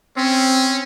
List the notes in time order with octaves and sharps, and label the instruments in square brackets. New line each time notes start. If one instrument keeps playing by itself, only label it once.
[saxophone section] C4 [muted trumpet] C#4